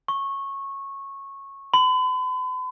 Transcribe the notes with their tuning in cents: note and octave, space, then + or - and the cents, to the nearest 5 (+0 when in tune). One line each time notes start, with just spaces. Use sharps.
C#6 -15
B5 +45